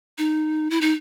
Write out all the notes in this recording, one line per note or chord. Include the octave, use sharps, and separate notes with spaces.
D#4
E4
D#4